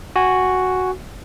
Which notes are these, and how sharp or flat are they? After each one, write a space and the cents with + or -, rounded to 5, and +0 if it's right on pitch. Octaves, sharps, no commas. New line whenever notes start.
F#4 +0 G#5 -10